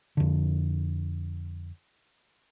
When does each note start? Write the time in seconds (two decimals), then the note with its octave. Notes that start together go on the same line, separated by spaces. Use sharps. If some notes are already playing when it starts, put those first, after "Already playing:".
0.17 F2 D3